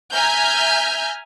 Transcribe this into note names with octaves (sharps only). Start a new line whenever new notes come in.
E5 G#5 A#5 F6 G6